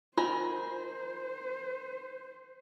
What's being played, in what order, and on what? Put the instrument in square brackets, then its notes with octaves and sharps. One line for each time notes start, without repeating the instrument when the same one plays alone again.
[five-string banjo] D#3 G#5 A#5 [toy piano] F4 [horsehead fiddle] C5